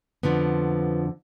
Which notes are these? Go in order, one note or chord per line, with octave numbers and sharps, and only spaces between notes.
F2 D3 F3 B3